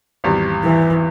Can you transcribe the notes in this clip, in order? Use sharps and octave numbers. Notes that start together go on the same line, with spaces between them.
G#1 E2 G3
E3